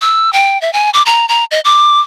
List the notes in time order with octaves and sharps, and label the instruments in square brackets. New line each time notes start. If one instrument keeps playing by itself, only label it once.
[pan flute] E6
G5
E5
G#5
D6
A#5
A#5
D#5
D6